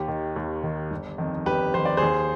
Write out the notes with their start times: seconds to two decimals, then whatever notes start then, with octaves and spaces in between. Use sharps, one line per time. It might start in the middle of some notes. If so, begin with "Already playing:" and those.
Already playing: D#2 G4
0.08 D#3
0.36 D#2
0.63 D#3
0.91 G1
1.18 F2 D#3
1.46 G1 G4 B4
1.74 F2 D#3 C5
1.85 D5
1.97 D#2 G#4 C5